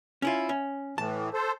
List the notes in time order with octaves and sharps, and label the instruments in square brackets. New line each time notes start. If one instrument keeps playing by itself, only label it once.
[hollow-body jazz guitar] C#4 E4 F4
C#4
[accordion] A2 E3 [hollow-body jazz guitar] A5
[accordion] A4 C5